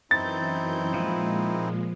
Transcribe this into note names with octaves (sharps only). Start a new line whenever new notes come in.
F#2 E3 C4 D#4 E4 G6 A6
A#2 F3 G#3 B4